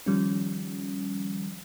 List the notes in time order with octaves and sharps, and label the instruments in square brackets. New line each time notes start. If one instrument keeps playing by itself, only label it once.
[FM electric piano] D#3 F3 G3 C#4